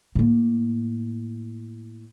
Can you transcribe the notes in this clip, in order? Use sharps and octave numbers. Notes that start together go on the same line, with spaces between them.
A2 A#3